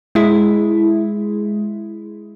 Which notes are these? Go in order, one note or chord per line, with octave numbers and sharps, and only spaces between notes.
G#3 E4